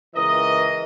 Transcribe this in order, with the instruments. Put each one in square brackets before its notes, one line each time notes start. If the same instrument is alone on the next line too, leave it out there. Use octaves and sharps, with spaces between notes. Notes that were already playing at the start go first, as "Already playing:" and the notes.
[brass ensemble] C#2 E3 A#4 D#5